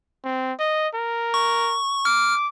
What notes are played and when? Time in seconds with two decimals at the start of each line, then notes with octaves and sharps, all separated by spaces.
0.25 C4
0.59 D#5
0.94 A#4
1.34 C#6
2.05 D6 F6